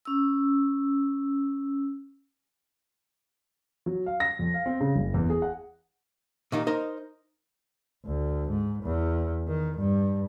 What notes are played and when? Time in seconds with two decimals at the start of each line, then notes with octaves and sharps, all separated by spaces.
0.05 C#4 E6
3.86 F#3
4.06 F5
4.20 A#6
4.39 F2
4.54 F5
4.66 C4
4.80 C#3
4.95 F#1
5.14 E2
5.30 G#4
5.42 F#5
6.52 A#2 D#3 D#4 G4
6.67 D#4 A#4 C5 D#5
8.05 D2
8.50 G#2
8.83 E2
9.48 D#3
9.78 G2